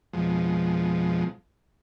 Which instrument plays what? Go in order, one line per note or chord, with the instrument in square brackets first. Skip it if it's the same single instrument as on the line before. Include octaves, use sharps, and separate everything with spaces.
[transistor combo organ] F2 B2 F3 G#3